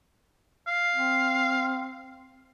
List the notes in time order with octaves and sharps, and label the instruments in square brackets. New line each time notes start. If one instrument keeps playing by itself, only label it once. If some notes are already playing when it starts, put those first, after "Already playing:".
[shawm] F5
[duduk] C4